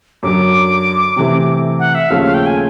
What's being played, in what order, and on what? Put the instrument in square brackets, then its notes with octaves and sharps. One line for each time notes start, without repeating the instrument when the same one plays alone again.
[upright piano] F#2 D3 F#3 [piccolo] D6
[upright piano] C3 E3 A3 C4
[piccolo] F#5
E5
[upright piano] D#2 C#3 F3 A3 [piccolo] F5
[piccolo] F5
G5
G#5